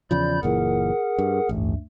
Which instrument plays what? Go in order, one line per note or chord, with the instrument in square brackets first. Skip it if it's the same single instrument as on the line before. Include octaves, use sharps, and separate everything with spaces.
[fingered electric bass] E2 C#3 F3 [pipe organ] D5 B5 G6
[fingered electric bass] F#1 A#2 E3 [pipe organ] G#4 A#4 F#5
[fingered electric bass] G2
[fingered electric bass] A1 [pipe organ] D2 G2 A3